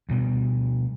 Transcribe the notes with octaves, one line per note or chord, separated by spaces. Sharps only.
D2 B2 G3